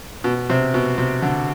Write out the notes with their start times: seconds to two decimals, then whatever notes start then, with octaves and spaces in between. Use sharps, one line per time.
0.24 B2
0.50 C3
0.74 B2
0.98 C3
1.22 D3